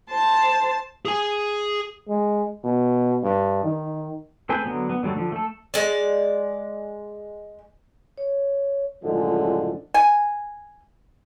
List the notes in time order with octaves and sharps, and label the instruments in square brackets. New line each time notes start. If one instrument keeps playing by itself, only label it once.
[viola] C5 A5
[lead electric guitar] G#4 G#5
[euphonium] G#3
B2
G2
D#3
[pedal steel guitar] A3 C4 G#4 B4 G5
D3 F#3 B3
B3
D3 F#3 G3 A3
D3 F3
A3 A4
[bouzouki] G#3 D5
[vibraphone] C#5
[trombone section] C#2 F#2 A2 D3 F3 G#3
[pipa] G#5